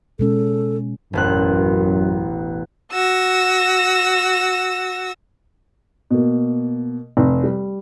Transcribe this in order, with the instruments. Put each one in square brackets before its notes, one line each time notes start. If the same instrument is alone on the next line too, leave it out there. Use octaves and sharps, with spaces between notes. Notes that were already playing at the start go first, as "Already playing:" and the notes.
[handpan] B2 G#3 C#4 [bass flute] A4
[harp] E1 A1 F#6 [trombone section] F#2
[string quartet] F#4 E6 A#6
[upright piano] B2 A#3
F1
G3